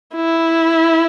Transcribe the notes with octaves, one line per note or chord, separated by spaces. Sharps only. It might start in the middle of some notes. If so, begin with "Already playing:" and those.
E4